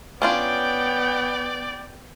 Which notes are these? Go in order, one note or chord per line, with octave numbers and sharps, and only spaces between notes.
B3 C#4 D4 F4 D5 G5